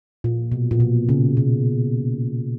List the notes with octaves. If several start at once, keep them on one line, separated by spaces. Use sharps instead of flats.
A#2
B2
A#2
B2
C#3
B2